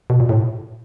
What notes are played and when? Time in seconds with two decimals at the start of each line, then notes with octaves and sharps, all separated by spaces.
0.10 B2
0.20 A#2
0.29 A2